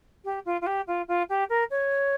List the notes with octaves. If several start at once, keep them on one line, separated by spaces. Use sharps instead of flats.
G4
F4
F4
G4
F4
F4
G4
A#4
C#5